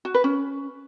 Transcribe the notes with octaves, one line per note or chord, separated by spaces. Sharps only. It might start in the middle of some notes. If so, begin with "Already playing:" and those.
F#4
B4
C#4